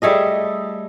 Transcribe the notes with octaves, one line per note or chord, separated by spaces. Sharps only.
G3 A3 G#4 D#5